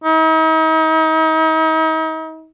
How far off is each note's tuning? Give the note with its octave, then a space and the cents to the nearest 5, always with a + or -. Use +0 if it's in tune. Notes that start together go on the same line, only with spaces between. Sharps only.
D#4 +40